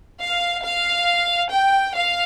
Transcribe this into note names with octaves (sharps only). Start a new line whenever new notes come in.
F5
F5
G5
F5